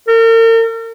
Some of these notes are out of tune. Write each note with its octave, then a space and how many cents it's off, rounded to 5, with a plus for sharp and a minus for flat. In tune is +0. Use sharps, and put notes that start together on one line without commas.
A#4 -40